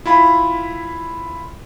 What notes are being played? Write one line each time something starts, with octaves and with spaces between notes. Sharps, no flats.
E4 F4 B5